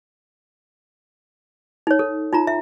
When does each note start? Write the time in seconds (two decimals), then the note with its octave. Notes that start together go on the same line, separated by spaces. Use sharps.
1.87 D#4 C#5
1.99 A4
2.33 D#4 F4 A#5
2.47 E5